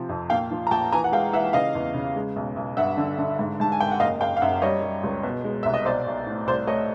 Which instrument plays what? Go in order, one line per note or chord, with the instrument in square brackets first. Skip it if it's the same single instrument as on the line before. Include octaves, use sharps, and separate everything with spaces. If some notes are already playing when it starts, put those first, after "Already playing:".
Already playing: [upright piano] C3 F3
F2
A#2 F5 G5
F3
A#5
A#1 G5 A5
E3 G#5 A#5
F#5
G#3 F5 G5
E3 E5 F#5
C#3 D#5 F5
E2
C#3
G#3
B1
B1
G2 E5 F#5
D3
D3
G#2
G#2 A5
G#5
G#1 G5
F#5
F#1 D#5 F5
F#1 F5 G5
F5
F#2 E5 F#5
G3 C#5 D#5
G3
C#2
B2
G#3
C2 E5
D#5
B1 C5 D5
B1
A2
C2 C5 D5
A3 C#5 D#5